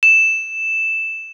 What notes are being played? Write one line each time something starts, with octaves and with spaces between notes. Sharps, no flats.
E7